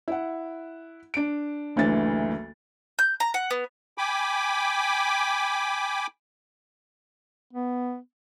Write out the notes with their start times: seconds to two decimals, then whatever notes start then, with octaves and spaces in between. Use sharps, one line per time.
0.08 E4 F#5
1.14 D4 D7
1.76 F#1 D2 D3 E3 A6
2.99 G6
3.20 A#5
3.34 F#5
3.51 B3
3.98 G5 G#5 B5 D6
7.53 B3